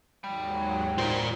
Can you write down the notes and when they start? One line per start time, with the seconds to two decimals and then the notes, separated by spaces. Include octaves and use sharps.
0.24 D#2 G#2 F#3 G5 B5
0.98 F#2 D#3 F4 C5 D5